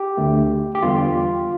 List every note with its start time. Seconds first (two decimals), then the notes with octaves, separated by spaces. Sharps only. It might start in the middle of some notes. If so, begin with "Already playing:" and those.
Already playing: G4
0.17 D2 D3 A3
0.75 G4
0.82 E2 D3 G3 B3 F4